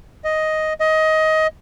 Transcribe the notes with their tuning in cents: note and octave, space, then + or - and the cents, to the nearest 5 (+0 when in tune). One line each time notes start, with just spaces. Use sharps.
D#5 +5
D#5 +20